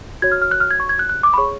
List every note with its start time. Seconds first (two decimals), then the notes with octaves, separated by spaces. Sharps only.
0.22 F#4 C#5 G#6
0.32 F6
0.42 F6
0.51 F#6
0.60 F6
0.71 G#6
0.80 C#6
0.89 G#6
0.99 F#6
1.09 F#6
1.23 D6
1.34 B5
1.37 G#4 C#5 C#6